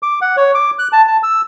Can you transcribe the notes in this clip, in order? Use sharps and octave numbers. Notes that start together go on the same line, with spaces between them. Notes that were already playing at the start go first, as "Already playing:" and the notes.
D6
F#5
C#5
D6
F#6
A5
A5
E6